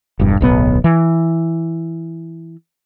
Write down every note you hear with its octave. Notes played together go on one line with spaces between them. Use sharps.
E1 G2
D1 B1 B3
E3